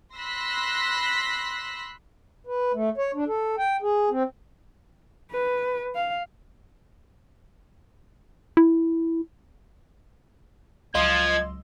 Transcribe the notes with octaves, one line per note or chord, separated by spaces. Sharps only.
B5 C6 E6 F#6 A#6 B6
B4
A3
C#5
D4
A4
G5
G#4
C4
B4
F5
E4
C#2 F3 F#3 D#5 C6 E6 G#6